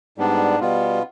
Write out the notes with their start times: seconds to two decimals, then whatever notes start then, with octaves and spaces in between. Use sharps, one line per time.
0.18 G#2 G3 B3 D4
0.60 B2 G3 B3 F4